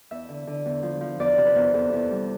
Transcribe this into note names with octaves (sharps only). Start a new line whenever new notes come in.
E2 E5
D3
D3
E2
F3
F3
E2 D5
C3
B4
E2
E2 A4
E2
G3